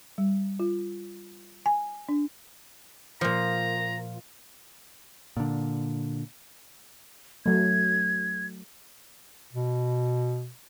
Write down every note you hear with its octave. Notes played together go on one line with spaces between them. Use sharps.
G3
F4
G#5
D4
A#2 F3 A#5
A#2 D3
F#3 A3 G#6
B2